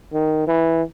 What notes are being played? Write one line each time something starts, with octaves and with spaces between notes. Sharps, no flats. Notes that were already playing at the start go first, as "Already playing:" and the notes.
D#3
E3